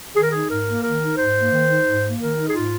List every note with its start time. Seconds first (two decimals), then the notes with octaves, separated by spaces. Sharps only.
0.14 D#3 G#4
0.23 A#4
0.31 D#4 G#4
0.48 G#2 A#4
0.66 A#3
0.83 D#3 A#4
1.00 D#4
1.16 G#2 C5
1.35 A#3
1.51 D#3
1.68 D#4
1.85 G#2
2.02 A#3
2.19 D#3 A#4
2.36 D#4
2.48 G#4
2.53 G#2 F4